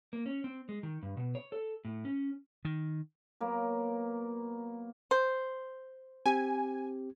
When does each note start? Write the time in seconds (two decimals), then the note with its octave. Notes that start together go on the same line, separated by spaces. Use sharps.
0.13 A#3
0.26 C#4
0.44 C4
0.69 G#3
0.83 D#3
1.03 G2
1.17 B2
1.35 C#5
1.52 A4
1.85 A2
2.05 C#4
2.65 D#3
3.40 F#3 A#3 B3
5.11 C5
6.26 C4 G4 G#5